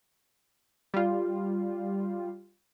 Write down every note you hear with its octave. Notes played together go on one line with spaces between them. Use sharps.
G3 F4